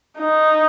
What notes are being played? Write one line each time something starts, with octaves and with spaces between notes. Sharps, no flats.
D#4